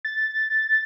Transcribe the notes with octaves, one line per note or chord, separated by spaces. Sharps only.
A6